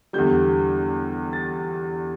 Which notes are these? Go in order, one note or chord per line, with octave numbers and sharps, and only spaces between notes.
E2 D3 G3 G6
A6